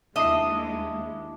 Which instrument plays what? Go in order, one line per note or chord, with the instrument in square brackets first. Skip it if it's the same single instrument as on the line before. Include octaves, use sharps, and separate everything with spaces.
[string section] D#2 G#3 [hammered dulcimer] D4 E4 [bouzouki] D#5 [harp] E5 D#6 C7